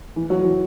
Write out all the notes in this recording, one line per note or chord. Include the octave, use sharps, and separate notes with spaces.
E3
F#3
E3